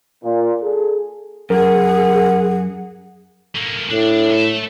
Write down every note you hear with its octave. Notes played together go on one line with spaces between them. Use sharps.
A#2
G#4 A4
F#2 G#4 A#4 F#5
A3 A#3
A2 D4
A3 E5